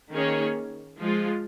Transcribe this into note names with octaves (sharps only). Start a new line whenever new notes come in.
D#3 A#3 C#4 G#4 C#5
F3 G#3 F4